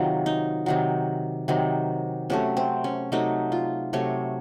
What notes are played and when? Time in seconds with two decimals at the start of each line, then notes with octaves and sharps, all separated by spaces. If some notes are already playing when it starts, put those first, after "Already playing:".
Already playing: C3 D#3 F#3 F4
0.26 D#4
0.66 C3 D#3 F#3
1.48 C3 D#3 F#3
2.30 C3 F#3 A3 C#4
2.57 C4
2.84 C#4
3.12 C3 F#3 A3 D#4
3.52 F4
3.93 C3 F#3 A3 C#5